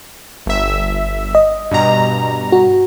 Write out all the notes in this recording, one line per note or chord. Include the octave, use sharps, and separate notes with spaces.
G1 E5
D#5
G2 B2 A#5
F#4